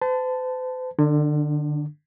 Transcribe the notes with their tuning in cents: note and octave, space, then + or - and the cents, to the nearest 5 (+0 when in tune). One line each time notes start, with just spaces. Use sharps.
C5 -45 A5 +0
D3 +30 D4 -15